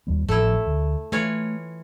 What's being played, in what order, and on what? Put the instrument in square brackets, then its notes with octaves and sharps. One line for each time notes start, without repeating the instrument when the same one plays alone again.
[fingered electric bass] D#2 G3 B3
[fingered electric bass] G#1 A2 F3 [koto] A3 E4
[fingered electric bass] D2
[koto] E3 F4 C#5 [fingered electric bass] A3